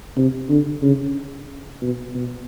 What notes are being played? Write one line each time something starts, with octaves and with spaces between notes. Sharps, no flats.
C3
D3
C#3
B2
B2